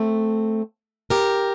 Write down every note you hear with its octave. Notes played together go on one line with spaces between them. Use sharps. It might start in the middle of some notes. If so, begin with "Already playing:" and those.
Already playing: A3 C4
G4 A#4